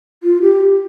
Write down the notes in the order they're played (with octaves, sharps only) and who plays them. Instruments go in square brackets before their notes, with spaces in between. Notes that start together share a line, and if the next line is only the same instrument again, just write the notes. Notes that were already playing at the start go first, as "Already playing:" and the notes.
[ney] F4
G4